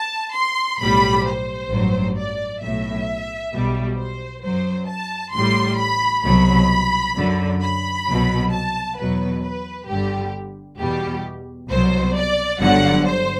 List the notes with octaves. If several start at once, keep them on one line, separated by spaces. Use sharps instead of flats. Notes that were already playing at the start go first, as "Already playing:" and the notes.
Already playing: A5
C6
B1 A2 G3 B5
C5
A1 G2 F#3
D5
B1 A2 F#3 E5
B1 B2 G3
C5
F#2 F#3 C5
A5
A1 A2 G3 C6
B5
C2 B2 F#3 B5
F#2 D3 F#3
B5
C2 B2 F#3
A5
E2 B2 F#3 B4
B4
G1 G2 D3 G3 G4
E2 B2 G3 G4
C2 B2 F#3 C5
D5
G1 G2 D3 F#3 F#5
C5